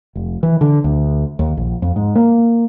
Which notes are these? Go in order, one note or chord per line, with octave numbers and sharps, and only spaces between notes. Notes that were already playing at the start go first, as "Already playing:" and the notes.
F1
E3
D3
D2
D#2
A#1
F2
G#2
A#3